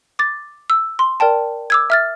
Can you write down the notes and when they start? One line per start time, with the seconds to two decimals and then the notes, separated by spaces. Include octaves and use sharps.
0.19 D6 A6
0.70 E6
0.99 C6
1.20 A#4 D5 G5 A5
1.70 D6 E6 G#6
1.90 E5 F6 A6